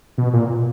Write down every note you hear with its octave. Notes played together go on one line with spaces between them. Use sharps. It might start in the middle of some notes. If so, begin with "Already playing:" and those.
B2
A#2